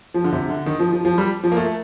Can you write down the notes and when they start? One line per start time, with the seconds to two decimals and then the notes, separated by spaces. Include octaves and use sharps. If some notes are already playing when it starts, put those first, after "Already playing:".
0.14 F3
0.24 D3
0.32 C3
0.49 D3
0.66 D#3
0.79 F3
0.92 F3
1.05 F3
1.18 G3
1.44 F3
1.52 A#3
1.57 A3